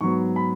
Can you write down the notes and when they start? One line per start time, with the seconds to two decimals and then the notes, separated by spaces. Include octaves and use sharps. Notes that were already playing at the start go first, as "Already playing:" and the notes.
0.01 G#2 F#3 B3 C#6
0.36 B5